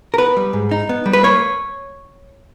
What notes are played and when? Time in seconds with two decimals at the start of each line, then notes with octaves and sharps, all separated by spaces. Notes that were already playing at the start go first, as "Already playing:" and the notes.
0.14 A#4
0.18 B3 B4
0.37 G3
0.53 G#2
0.71 D#4
0.89 B3
1.06 G3
1.13 B4
1.23 A#3 C#5